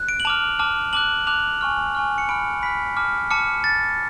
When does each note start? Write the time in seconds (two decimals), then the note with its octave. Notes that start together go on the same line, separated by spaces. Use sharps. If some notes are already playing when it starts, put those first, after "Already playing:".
Already playing: F#6
0.09 D7
0.20 F#7
0.25 A5 D6 F6 F7
0.59 A5 D6 F6
0.93 A5 D6 F#6 F#7
1.27 A5 D6 F#6 F7
1.61 G#5 C#6 F6
1.95 G#5 C#6 F6
2.18 C#7
2.29 B5 F6 D7
2.62 B5 F6 B6
2.97 A5 D6 F6
3.31 A5 D6 F6 C#7
3.64 A6